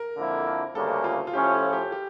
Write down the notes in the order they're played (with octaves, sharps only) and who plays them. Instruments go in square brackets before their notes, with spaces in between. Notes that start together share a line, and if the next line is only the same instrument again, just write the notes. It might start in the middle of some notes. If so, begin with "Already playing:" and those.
Already playing: [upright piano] A#4
[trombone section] F2 D3 F3 A#3 E4
[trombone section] D2 C#3 G3 A#3 C#4 [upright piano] A4
[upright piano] F4
F4
[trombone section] A2 F3 C#4 [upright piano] G4
[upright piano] A4
G4
G4